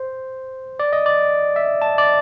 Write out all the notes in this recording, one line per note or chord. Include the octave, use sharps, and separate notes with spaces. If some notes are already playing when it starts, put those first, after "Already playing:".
Already playing: C5
D5
D#5
D5
E5
A5
D5